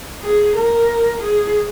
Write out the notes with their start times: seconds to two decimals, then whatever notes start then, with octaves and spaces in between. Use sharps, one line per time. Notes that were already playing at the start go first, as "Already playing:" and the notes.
0.23 G#4
0.56 A#4
1.22 G#4